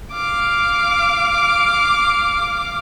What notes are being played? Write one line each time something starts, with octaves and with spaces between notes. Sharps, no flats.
F5 D6